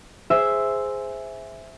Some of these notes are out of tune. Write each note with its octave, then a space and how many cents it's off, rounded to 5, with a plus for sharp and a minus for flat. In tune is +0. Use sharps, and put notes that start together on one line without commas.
G#4 +0 C5 -5 E5 +0